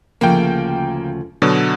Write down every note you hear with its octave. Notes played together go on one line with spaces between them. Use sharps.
D2 C#3 F3 A#3 G5
B2 D3 F#3